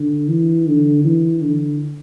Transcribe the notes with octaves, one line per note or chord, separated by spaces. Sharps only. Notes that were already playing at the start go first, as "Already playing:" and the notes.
Already playing: D3
E3
D3
E3
D3